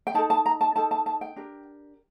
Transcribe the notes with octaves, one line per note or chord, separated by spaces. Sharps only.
G5
D#4 A4 A5
A5
A#5
A5
D#4 A4 A5
A5
A5
G5
D4 G4 A#4